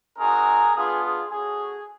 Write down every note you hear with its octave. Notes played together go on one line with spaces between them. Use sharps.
C4 D#4 F#4 G#4 A#4
B3 D4 F4 G#4
G#4
A3 C#4 F#4 G#4